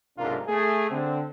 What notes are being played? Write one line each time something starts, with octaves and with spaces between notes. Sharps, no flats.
B1 G#2 C3 D4 F4 A#4
A3 G#4
D3 C4